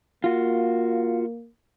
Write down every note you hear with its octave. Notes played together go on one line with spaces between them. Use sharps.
A#3 F4 F#4